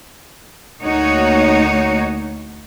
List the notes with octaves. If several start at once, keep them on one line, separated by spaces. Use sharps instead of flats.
D2 A#3 D#4 F#4 C#5